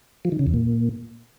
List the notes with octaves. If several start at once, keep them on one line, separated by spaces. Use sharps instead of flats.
F3
D#3
C#3
E2
A#2